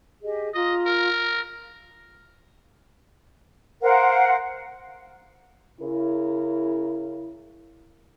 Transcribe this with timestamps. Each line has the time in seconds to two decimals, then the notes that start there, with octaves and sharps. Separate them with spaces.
0.23 G4 G#4 D#5
0.54 F4 D#5 A#5
0.86 A#4
3.82 A#4 C5 F5 F#5
5.81 C#3 E4 A#4